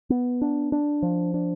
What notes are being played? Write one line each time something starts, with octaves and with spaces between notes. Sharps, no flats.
B3
D4
D4
F3
D4